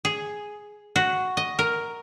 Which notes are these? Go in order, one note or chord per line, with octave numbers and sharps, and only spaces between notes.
G#4
F#4
D#5
A#4